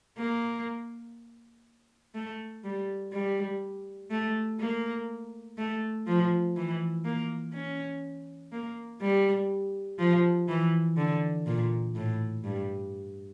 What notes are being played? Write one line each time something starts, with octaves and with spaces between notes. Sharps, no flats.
A#3
A3
G3
G3
A3
A#3
A3
F3
E3
A#3
C#4
A#3
G3
F3
E3
D3
A#2
A2
G2